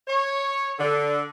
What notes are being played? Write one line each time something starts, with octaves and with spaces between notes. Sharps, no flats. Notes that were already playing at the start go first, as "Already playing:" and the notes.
C#5
D3